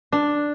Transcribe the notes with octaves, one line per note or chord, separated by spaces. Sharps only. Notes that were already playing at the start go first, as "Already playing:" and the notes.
D4